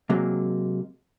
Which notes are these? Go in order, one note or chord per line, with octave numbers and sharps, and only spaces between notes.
C3 F#3 G#3 A#3